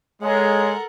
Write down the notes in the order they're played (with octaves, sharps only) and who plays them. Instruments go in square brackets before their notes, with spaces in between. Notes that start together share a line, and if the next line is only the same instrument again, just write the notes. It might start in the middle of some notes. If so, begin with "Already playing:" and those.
[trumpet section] G#3 [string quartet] A4 A#4 F#5 [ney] C#5